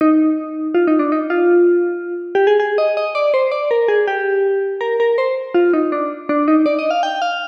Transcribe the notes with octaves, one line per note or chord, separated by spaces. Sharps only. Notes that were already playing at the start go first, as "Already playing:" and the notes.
D#4
F4
D#4
D4
D#4
F4
G4
G#4
G#4
D#5
D#5
D5
C5
D5
A#4
G#4
G4
A#4
A#4
C5
F4
D#4
D4
D4
D#4
D5
D#5
F5
G5
F5